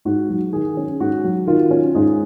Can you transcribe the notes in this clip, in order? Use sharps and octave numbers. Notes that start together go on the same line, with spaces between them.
G#2 F#4
F#3
D#3 G#4
C#4
G#2 F#4
F#3
D#3 F4
C#4
G#2 G#4